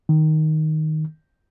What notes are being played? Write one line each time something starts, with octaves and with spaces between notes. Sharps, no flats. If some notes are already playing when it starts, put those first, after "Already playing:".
D#3